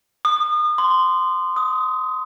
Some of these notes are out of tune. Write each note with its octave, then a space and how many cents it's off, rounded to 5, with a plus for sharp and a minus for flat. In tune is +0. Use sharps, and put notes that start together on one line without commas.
D#6 -35
C6 -15
D#6 +20